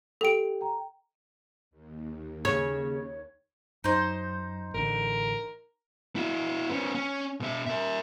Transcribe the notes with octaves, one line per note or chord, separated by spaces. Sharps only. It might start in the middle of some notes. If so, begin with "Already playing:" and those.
G4 A4 G5 D7
G5 A#5
D#2
C#3 C#5
F#2 D#4 C5
A1 D3 A#4
E4 F#4
B3 C#4
C#4
B2 E5
A#4 E5